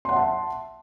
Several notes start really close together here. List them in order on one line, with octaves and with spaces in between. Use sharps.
C6 F#5 E5 A5